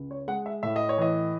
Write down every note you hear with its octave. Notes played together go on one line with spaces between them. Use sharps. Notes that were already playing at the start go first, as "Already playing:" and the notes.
Already playing: C#2
C#5
G#3 F#5
E5
A2 E5
D#5
C#5
E3 D#5